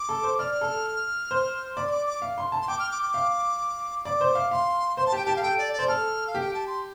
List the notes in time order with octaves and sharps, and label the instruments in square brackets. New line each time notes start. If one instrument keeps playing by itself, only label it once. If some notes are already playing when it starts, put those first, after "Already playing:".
Already playing: [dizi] D6
[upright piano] A4
C5
[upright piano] D5 [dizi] F6
[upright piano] A4
C5
[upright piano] D5 [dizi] D6
[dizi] C6
D6
D6
[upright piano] F5
C6
A5
[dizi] C6
[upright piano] G5 [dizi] D6
[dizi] F6
D6
D6
[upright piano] F5
[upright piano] D5 [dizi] D6
[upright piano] C5
F5
[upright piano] F5 [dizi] C6
[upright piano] C5 [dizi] C6
[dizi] A5
[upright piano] G4 [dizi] G5
[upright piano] G4 [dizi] A5
[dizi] F5
[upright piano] A4 [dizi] G5
[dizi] D5
D5
[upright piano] C5
[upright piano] A4 [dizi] F6
[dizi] F5
[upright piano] G4
[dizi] G5
A5
C6